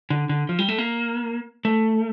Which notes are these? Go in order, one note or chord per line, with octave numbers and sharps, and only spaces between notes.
D3
D3
F3
G3
A3
A#3
A3